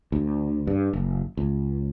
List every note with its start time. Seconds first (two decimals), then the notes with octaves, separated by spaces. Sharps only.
0.12 D2
0.67 G2
0.93 F#1
1.37 C#2